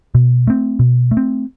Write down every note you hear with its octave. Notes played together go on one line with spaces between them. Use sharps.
B2
A3 C4
B2
A3
C4